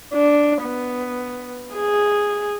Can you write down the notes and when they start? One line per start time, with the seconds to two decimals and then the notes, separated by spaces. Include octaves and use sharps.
0.14 D4
0.62 B3
1.75 G#4